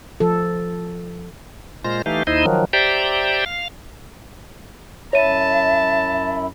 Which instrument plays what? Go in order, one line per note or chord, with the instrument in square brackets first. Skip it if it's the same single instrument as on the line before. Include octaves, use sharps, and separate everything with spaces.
[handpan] F3 A4
[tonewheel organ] A#2 G#3 F4 C5 A#6
E3 A3 D#4 G4 F5
D#2 D#4 E4 C5 D#5
D#3 F3 F#3
G4 C5 D5 E5 G5 A#5
F5
[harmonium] F#2 E4 [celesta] C#5 D#7 [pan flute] E5 [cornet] A5